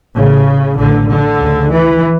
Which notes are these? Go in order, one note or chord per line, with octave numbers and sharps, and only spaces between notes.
A1 A2 C#3
A1 A2 D3
D3
D2 C#3
E3